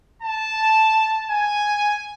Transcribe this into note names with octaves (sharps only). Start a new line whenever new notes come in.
A5
G#5